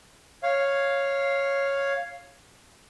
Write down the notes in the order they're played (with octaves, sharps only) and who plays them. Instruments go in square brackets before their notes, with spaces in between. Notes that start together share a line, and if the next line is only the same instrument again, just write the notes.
[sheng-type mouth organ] C#5 F5